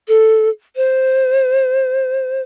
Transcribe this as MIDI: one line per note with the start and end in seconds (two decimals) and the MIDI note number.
0.08 0.49 69
0.76 2.42 72